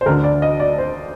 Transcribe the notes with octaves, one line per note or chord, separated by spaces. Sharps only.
C5
D2 D3 A#4
D5
D#5
D5
C5